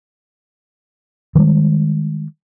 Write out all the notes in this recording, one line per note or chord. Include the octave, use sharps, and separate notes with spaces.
D#3 E3 G3 G#3